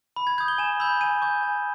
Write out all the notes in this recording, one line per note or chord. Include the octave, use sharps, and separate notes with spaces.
B5
G#6
D#6 G6 G#6
G7
G#5 E7
B5 E6 G6
G#5 D#7
C#6 G6
G#5